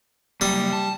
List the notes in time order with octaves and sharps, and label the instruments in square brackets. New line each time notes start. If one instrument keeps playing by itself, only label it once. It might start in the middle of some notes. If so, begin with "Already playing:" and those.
[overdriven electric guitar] F#3 A#3 [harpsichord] G3 D#6
[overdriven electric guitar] A5